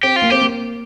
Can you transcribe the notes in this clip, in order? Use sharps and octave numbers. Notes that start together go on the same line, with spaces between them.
C4 G4
F4
A#3
C4 G4
A#3